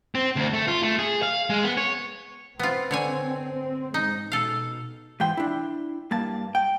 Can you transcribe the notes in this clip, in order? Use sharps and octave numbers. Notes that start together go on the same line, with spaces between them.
C4
D2
A3
F4
A3
G#4
F5
G#3
B3
C#5
B3 C4 F4
D3 C#5 G#5
G#2 G#3 D#4
B2 A4 F5
G#2 E3 G5 C6
D4 E4
G2 A#3 A5
G5